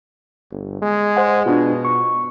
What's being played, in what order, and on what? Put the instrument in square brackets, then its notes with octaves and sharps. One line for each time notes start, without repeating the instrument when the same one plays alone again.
[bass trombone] G1
G#3
[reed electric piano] C5 F#5
[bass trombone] B2 [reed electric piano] D4 F4
[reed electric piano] C#6